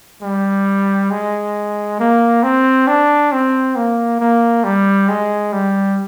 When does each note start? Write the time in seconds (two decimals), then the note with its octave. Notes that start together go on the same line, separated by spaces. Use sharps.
0.22 G3
1.11 G#3
2.00 A#3
2.43 C4
2.88 D4
3.32 C4
3.76 A#3
4.20 A#3
4.64 G3
5.09 G#3
5.53 G3